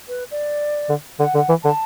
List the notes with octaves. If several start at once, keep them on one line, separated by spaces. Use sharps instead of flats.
B4
D5
D3
D3 F#5
D3
E3
D3 A5